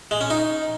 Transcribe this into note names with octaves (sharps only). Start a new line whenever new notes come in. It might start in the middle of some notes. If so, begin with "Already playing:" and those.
G#3
C#4
D#4